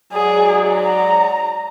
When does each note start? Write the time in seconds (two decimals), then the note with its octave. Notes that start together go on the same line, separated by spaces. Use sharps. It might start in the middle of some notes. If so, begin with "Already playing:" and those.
0.13 G#2 F#3 G#4 D5
0.72 A#5